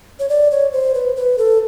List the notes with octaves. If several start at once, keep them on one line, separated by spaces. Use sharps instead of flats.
C#5
D5
C#5
C5
B4
B4
A4